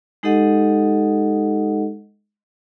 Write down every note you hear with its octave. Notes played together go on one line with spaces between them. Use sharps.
G#3 D#4 G4 A4 D#5 F#5